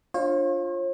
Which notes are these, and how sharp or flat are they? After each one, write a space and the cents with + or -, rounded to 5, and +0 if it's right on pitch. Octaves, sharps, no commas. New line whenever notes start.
D4 +0 F4 +0 C#5 -45